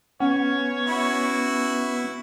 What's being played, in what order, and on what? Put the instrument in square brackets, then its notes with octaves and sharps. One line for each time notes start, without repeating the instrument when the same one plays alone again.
[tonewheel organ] B3 [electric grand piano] C#4 [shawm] C#5
[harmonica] E4 F#4